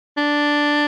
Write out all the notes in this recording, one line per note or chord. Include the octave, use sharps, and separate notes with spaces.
D4